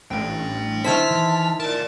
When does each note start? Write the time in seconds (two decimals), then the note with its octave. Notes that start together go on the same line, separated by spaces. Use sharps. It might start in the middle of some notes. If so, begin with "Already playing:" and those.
0.11 A1 D4 G5
0.84 D#3 E4 C5 A5 F6 B6
1.10 E3
1.60 A#4 D5 A5